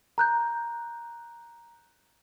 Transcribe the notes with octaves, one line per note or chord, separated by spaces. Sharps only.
A#5 F#6 G6